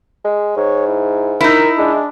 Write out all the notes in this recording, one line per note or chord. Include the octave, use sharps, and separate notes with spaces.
G#3
G#2 C#5
E4
D#4 E4 A#4
G#3 D4